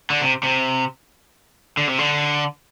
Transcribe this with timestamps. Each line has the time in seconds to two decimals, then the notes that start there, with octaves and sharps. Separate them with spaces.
0.10 D3
0.21 C3
0.43 C3
1.77 D3
1.88 C3
1.99 D3